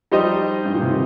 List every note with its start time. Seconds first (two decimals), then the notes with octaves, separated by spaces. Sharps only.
0.12 F3 G3 D#4 G4 C5 D#5
0.65 G2
0.74 A#2
0.82 C3
0.90 D#3